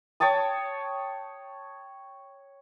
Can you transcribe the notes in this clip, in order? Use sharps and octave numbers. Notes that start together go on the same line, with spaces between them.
C#5 G5 A5 D#6